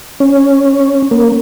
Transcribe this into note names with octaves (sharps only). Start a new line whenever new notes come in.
C#4
A#3